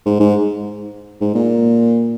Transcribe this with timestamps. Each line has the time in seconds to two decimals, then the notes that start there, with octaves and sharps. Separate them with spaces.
0.06 G#2
0.20 G#2
1.21 G#2
1.35 A#2